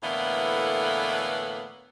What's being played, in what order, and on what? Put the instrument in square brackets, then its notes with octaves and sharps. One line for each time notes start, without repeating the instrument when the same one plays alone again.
[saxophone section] A2 D3 E3 A#3 B3